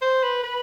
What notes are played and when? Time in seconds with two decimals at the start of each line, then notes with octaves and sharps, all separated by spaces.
0.02 C5
0.23 B4
0.44 B4